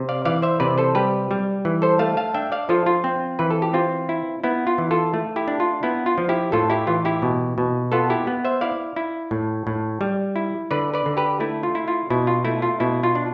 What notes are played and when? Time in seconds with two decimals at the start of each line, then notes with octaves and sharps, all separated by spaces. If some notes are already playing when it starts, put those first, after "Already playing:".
Already playing: C3
0.09 D5 F5
0.25 E3 D5 F5
0.42 C5 E5
0.60 C3 B4 D5
0.78 A4 C5
0.95 G3 G4 B4
1.31 G3
1.65 E3
1.82 A4 C5
1.99 A3 F5 A5
2.17 F5 A5
2.34 D4 E5 G5
2.52 D5 F5
2.69 F3 F4 A4
2.86 F4
3.04 C4
3.39 E3 B4
3.51 A4
3.62 G4
3.73 C4 F4
4.09 E4
4.44 B3 E4
4.67 F4
4.78 E3
4.91 F4 A4
5.14 A3
5.36 E4 G4
5.48 D4
5.60 F4
5.83 B3 E4
6.06 F4
6.18 F3
6.29 E4 G4
6.52 A2 F4 A4
6.70 E4 G4
6.87 E3 F4
7.05 E4 G4
7.22 B2
7.58 B2
7.92 B3 F4 A4
8.10 E4 G4
8.27 B3
8.45 C5 E5
8.61 E4 D5 F5
8.96 E4
9.31 A2
9.67 A2
10.01 G3
10.36 E4
10.71 D3 B4 D5
10.94 B4 D5
11.06 D3
11.17 G4 B4
11.40 A3 E4
11.63 F4
11.75 E4
11.88 F4
12.10 B2 E4
12.27 F4
12.45 A3 E4
12.62 F4
12.80 B2 E4
13.03 F4
13.15 D4